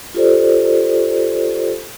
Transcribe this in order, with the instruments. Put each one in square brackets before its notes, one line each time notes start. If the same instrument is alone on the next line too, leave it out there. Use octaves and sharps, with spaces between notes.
[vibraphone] F4 G4 A4 C5 D5